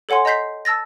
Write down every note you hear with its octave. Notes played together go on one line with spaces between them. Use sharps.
A4 C#5 F#5 G#5 C6
D#5 A#5 C6 G6 B6 C7
A5 E6 A6 A#6